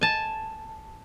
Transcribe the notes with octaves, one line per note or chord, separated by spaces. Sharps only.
G#5 A5